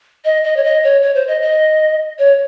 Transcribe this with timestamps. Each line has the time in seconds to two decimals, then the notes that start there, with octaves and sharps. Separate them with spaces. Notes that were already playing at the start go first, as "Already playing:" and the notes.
0.25 D#5
0.44 D#5
0.57 C#5
0.64 D#5
0.84 C#5
1.02 C#5
1.15 C5
1.28 D#5
1.42 D#5
2.19 C#5